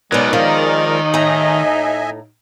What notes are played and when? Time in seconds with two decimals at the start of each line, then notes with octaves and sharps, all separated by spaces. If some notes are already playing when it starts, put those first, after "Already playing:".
0.12 B2 F#3 G#3 B3 C#4 D#4 A#4 D5
0.33 D#3 F3
1.14 A2 D#5 E5 G#5 A#5